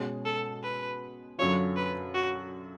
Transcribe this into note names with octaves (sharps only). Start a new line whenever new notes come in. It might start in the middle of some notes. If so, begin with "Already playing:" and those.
Already playing: B2 G#3 C#4
A4
B4
F#2 D3 F#3 C#4 F4 C#5
B4
F#4